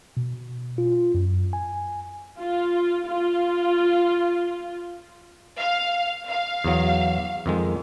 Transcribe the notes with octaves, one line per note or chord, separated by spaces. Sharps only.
B2
F4
F#2
G#5
F4
F4
F5
F5
E2 F#3
F2 D#3 G#3